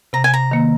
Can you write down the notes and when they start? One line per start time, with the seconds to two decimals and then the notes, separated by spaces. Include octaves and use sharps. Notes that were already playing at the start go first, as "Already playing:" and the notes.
0.13 C3 A#5
0.24 G#5
0.34 A#5
0.51 D#3 A#3